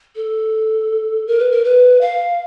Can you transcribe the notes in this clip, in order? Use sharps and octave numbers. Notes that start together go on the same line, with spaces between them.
A4
A#4
B4
A#4
B4
F5